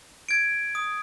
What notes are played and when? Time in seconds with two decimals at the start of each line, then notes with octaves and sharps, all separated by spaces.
0.29 G#6 D7
0.75 D#6